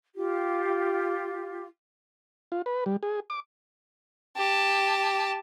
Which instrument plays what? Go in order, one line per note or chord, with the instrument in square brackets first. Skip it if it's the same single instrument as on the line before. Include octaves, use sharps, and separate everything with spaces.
[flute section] F4 G4
[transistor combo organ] F4
B4
G3
G#4
D6
[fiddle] G4 A5